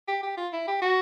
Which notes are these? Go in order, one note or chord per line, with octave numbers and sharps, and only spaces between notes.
G4
G4
F4
E4
G4
F#4